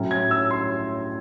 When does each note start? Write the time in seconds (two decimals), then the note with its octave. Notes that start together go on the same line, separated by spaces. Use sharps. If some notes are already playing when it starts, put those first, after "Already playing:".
Already playing: A2 F#3 A3 C#4 E4
0.11 G#6
0.31 E6
0.51 C6